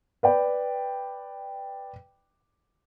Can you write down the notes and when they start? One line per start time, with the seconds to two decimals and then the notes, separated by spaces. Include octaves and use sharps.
0.23 B4 D5 G5 B5